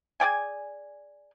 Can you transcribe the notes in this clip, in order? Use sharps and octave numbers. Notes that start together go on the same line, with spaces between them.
G#4 D5 G5 G#5